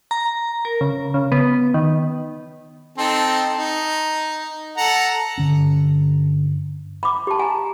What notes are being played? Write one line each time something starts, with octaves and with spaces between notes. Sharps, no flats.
A#5
A#4
C#3
C#3
B3
D#3
C4 D#4 A4
D#4
A4 F#5 A#5
G2 D3 C#4
B5 D6
G4 A5
G#5 A#5